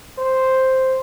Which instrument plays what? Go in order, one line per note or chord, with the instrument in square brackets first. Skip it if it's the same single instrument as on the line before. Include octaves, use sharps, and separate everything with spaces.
[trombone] C5